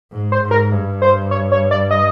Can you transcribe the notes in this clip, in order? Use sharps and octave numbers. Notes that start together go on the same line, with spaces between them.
G#2
C5
G#2
A#4
G2
C5
C#5
C#5
D5
D#5